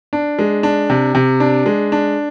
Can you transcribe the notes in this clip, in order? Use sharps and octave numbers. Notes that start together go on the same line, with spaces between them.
D4
G#3
D4
C3
C3
D4
G#3
D4